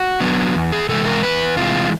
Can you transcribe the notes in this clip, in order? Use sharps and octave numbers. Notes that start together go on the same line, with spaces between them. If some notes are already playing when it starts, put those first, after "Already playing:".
Already playing: F#4
F#3 B3 D4
E2
G#4
C3 E3 G#3 A4
A#4
E2 B4
C3 E3 G#3 F4